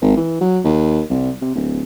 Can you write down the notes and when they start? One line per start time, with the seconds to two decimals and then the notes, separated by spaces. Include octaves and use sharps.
0.02 G#1
0.17 E3
0.41 F#3
0.64 D#2
1.10 C2
1.42 C3
1.55 D1